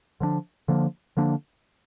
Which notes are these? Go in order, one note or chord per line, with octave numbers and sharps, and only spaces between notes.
D3 F3 A#3 D4
D3 F3 A#3 D4
D3 F3 A#3 D4